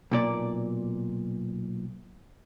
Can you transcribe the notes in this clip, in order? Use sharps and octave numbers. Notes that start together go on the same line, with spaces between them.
B1 A#2 D5